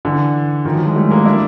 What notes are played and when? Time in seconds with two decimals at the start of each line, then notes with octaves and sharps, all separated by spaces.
0.05 D3 E3
0.65 D#3 F3
0.75 E3 F#3
0.85 F#3 G#3
0.96 G3 A3
1.10 G#3 A#3
1.25 D4 E4